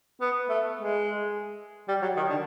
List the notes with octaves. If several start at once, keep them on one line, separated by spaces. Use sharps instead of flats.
B3
A3
G#3
G3
F#3
D#3
D3